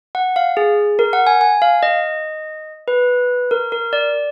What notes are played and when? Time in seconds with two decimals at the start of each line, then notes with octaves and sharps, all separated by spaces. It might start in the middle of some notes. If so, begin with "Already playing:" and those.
0.15 F#5
0.36 F5
0.57 G#4
0.99 A#4
1.13 F#5
1.27 G#5
1.41 G#5
1.62 F5
1.83 D#5
2.88 B4
3.51 A#4
3.72 A#4
3.93 D5